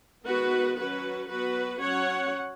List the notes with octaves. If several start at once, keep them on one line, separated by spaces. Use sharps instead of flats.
D#3 G#3 B3 F#4 B4
F#3 C#4 F#4 B4
F#3 B3 F#4 B4
F#3 C#4 C#5 F#5